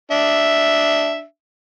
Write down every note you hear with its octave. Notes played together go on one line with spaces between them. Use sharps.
D4 E5